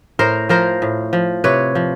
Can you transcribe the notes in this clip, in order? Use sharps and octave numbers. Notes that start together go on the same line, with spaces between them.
A2 A#4 C5
F3 A#4 C5
A2
F3
C3 B4 C#5
F3